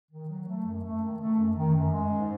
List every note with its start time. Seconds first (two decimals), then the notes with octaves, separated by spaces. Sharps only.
0.11 D#3
0.29 F#3
0.47 A3
0.65 F#2
0.83 A3
1.02 D#3
1.20 A3
1.38 F#2
1.56 D#3
1.74 F#2
1.92 G#3
2.10 G#2